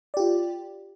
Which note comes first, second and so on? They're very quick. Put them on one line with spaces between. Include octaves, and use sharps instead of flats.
D5 G4 F4